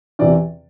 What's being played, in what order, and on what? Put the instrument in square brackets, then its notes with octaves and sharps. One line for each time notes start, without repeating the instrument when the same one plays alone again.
[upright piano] E2 C3 E3 D5